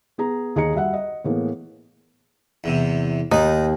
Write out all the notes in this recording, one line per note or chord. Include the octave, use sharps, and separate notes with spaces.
B3 G#4 A#5
D#2 G#4 D#5 A#5 C#7
G3 F#4 E5 F#5
D#5
A2 E3 A#3 B3 G#4
E2 C3
D#2 D#4 D5 D#5